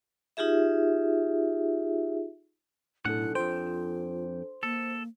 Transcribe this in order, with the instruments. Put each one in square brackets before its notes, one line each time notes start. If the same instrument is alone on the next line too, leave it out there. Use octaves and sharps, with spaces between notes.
[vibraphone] D#4 F4 G4 G#4 E5
[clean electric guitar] B1 C3 F#5 [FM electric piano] A2 [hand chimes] D4 A4 [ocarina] E4
[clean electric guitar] F2 G5 [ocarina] F4 [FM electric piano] C5
[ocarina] A#3 [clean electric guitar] A4